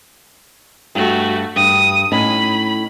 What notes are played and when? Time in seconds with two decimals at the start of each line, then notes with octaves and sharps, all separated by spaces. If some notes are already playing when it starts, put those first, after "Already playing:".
0.95 G2 A3 F#4
1.56 G2 D#6
2.12 A2 C#4 D#4 B5